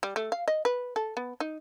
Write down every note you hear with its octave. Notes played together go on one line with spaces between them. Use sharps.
G3
A3
F5
D#5
B4
A4
B3
D#4